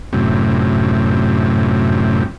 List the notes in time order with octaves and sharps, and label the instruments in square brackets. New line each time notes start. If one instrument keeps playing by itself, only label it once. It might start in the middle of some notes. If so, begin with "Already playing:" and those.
[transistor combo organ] F#2 A2 C3